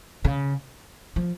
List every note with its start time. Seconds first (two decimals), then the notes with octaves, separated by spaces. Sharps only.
0.25 C#3
1.16 F3